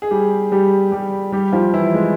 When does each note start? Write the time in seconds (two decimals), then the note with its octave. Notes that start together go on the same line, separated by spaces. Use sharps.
0.02 G#4
0.11 G3 G4
0.52 G3 G4
0.92 G3 G4
1.32 G3 G4
1.53 F3 F4
1.73 E3 E4
1.94 G#3